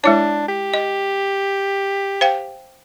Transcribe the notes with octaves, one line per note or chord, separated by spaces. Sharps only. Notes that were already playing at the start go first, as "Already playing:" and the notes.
G#3 D4 E4 C#5
G4
D#5
C5 F5 G5